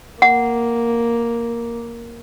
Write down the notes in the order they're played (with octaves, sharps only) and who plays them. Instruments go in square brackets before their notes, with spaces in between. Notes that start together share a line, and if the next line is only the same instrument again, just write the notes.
[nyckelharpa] A#3 [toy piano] F#5